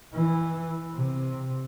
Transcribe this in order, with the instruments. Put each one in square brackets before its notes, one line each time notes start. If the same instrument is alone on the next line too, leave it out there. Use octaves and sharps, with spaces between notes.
[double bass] E3
C3